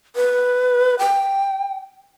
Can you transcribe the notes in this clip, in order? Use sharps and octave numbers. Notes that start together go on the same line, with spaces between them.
B4
G5